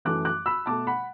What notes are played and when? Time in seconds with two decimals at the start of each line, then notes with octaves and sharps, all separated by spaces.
0.05 F#2 E3 A3 D6 F#6
0.25 D6 F#6
0.46 B5 E6
0.66 B2 A3 A5 D6
0.87 F#5 B5